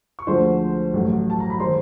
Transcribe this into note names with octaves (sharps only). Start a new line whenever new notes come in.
C#6
D2 D3 F3 G#3 C5 C6
A1 A2 F#3 A3
A5
A#5
B5
D#3 G#3 C5 C6